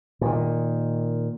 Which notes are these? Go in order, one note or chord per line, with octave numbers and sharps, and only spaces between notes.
A#2 D#3